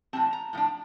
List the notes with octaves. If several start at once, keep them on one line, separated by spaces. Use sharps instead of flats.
A2 E3 G3 C4 A5
A#5
A2 F3 D4